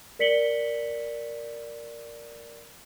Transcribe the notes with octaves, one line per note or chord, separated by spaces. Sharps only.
A#4 D5 B6 C#7 F#7 G7